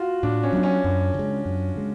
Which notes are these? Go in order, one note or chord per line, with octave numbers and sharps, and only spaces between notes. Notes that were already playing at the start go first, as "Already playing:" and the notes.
Already playing: F4 F#4
A2 D4
C#4
F#3 B3 D4
C#4
F#2
C#3 G#3
F#2
C#3 G#3